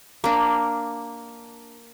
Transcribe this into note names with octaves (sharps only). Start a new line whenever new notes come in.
A#3 D4